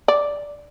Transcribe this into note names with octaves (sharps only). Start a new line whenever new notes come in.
D5